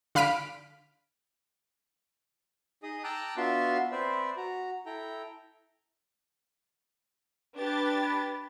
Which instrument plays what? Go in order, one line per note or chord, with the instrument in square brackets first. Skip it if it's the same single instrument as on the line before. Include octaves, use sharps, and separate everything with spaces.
[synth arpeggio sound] D3 F5 B5 F6 B6 D7
[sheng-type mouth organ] D#4 G#4 D#5 D#6
G5 A5 A#5 D6 E6 F#6
B3 D4 F4 F#4 E5 C6
C4 B4 C5 D5 E5
F#4 A#5
E4 A4 G5 A#5
[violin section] D4 G4 A6 [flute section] B4